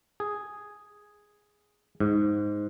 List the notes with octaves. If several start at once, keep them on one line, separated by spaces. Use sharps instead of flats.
G#4
G#2